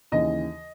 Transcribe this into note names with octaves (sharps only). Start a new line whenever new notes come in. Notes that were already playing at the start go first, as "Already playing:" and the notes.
D#2 C#3 E3 D#5